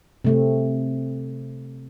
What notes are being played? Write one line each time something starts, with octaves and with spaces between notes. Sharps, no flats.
C3 A3 C4